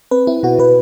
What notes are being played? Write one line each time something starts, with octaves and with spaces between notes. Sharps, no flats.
C4 B4
C4 E4
B2 F#4
B2 B4